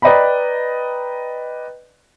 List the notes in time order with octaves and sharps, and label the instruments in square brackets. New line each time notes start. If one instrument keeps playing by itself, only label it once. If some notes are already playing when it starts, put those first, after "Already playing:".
[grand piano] B4 D5 D#5 G5 A#5 B5